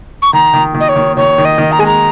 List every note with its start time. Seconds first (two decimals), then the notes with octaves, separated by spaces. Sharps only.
0.22 C#6
0.33 D#3 A#5
0.54 D#3
0.74 D#3
0.80 D#5
0.89 C#5
0.96 D#3
1.17 D#3 C#5
1.38 D#3
1.45 D#5
1.58 D#3
1.72 A#5
1.79 G#3 G#5
1.86 A#5